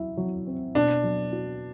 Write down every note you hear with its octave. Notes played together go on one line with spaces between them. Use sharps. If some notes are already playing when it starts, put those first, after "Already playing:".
Already playing: F#3 E4
F#3
C4
B2 D4
F#3
F#4